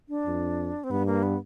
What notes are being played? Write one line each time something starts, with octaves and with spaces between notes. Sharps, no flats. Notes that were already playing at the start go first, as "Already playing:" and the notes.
D4
F2
C4
G2 B3
A#3
B3